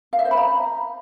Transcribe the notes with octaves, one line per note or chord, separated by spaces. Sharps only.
F5
E5
C5
B5
A#5